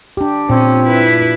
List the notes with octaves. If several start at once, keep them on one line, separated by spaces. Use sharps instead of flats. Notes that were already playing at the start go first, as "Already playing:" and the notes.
D4 G4
A#2 C4 C#4
E4 B4